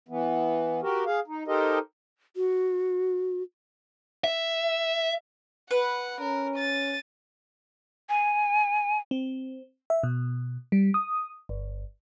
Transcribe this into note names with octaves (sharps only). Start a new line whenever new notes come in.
E3 B3
F#4 G4 A#4
G#4 F5
D#4
D#4 G4 A4 A#4 C5 D#5
F#4
E5
B4 F#5
C#4 A#4
A6 D#7
G#5
C4
E5
B2
G3
D#6
G1